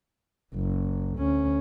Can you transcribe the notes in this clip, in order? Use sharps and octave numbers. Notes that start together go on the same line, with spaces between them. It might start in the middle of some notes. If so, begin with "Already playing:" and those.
F#1
D2 C#4